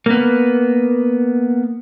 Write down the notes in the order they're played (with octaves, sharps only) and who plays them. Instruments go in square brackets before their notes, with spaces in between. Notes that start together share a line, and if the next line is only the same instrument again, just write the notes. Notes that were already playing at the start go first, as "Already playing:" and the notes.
[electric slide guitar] A#3 B3